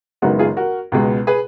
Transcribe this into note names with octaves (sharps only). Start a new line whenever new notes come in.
F#1 F#2 D#3 G#3 B3 F#4 A#4
F4 G#4
F#4 A#4
C#2 B2 G#3 B3
G#4 B4